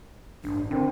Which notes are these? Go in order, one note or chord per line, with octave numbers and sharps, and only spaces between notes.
A1 G2 D4
D3 C4 E4 A#4 C5